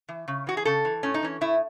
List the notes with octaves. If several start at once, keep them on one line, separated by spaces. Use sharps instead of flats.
E3
C#3
E3 F#4
G#4
C#3 A4
E3
A2 C#4
D#4
E3 C#4
A2 E4